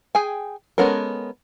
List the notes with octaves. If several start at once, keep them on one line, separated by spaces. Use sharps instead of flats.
G#4 G5 G#5
G#3 B3 C#4 A4 A#4